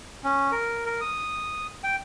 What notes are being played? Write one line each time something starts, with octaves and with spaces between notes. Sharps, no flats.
C#4
A#4
A#4
D#6
G5